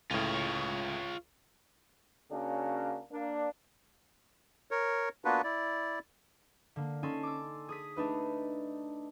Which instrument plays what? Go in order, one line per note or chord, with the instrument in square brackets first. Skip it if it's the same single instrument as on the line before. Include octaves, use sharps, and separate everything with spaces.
[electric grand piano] C#2 A2 [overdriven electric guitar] F4 C#5
[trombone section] C#3 A#3 C#4 D4 F#4
A#3 D4
[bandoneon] A#4 C#5
A#3 B3 D4 F4 F#4 B4
E4 D5
[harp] D3 A#3
C#4 D#4 A4 G#5 C6
D6 E6
G#4 D#6 B6
A3 D4 D#4 B4